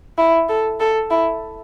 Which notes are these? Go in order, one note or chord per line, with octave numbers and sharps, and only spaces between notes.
E4
A4
A4
E4